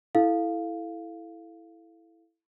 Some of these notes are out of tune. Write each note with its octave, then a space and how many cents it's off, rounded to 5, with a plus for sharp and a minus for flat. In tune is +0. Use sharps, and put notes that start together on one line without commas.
E4 +0 A4 -10 F5 +0